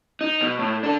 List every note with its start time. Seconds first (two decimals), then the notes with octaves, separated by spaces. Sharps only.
0.21 D#4
0.42 B2
0.59 A2
0.83 D4 A4